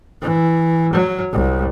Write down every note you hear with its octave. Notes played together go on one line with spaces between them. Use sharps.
E3
F#3
C2